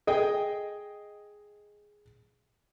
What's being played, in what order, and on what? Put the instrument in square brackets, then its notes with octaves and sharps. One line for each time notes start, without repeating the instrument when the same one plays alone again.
[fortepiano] G#4 D#5 G5